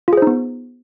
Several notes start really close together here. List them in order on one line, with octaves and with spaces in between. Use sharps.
F4 G#4 C5 D#4 B3